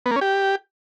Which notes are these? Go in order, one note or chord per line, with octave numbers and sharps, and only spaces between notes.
B3
A#3
C#4
G4